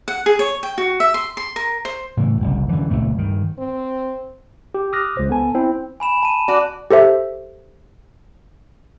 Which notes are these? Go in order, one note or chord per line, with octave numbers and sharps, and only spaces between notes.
F#5
G#4
C#5
G5
F#4
E5
C6
C6
A#4
C5
A2 C#3 E3
F#1 C2 F#2
F#2 D3 E3
F#1 C#2 A#2 A3
G2 D#3
C4
G4
D6 D#6 F6 F#6 A#6
C#2 C5
B3 A4 G#5 A5
C4 E4
G#5 B5 E7
A5 D#7
F#4 D5
G4 A4 C5 E5